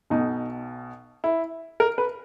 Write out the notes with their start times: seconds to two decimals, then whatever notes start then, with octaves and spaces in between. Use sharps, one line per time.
0.10 B1 B2 D#4
1.24 E4
1.80 A#4
1.98 B4